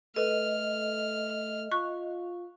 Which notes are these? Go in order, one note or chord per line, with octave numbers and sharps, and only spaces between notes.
A3 A4 B4 D#5 F6
F4 C#6 F#6